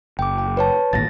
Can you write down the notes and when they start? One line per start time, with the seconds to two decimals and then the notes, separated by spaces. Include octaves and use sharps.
0.19 F#1 G5 D6
0.38 G5
0.57 B4 C#5 A5
0.93 D#1 G#1 D#2 A6 A#6